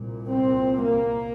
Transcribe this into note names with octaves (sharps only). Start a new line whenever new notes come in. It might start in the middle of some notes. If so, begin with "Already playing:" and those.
Already playing: C2 A#2
C4
A#3